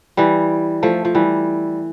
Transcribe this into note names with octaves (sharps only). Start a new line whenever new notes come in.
E3 G3
F3 A3
F3
E3 G3